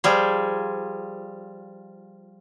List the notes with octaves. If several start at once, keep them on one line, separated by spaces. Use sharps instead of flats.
F3 G3 G#4